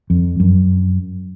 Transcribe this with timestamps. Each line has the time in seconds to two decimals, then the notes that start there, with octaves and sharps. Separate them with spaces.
0.10 F2
0.40 F#2